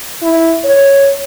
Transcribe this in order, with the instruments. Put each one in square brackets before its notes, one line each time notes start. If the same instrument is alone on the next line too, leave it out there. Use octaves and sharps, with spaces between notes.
[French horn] E4
C#5